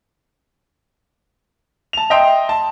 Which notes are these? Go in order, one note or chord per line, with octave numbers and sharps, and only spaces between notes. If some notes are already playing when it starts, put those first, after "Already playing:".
A5 F7
D#5 E5 G5 C6
A5